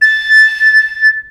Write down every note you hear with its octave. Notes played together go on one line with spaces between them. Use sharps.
A6